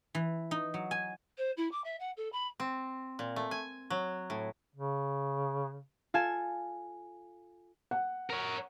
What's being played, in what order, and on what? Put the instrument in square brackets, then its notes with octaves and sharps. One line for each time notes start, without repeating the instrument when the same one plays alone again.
[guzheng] E3
D#4
F#3
G#5
[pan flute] C5
E4
D6
E5
F#5
A4
B5
[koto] C4
A#2
A3
G#5
F#3
A2
[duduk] C#3
[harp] F4 A4 G#5 E7
[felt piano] F#5
[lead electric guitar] A#4 C#5